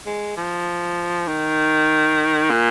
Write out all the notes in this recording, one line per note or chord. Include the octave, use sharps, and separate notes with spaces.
G#3
F3
D#3
A#2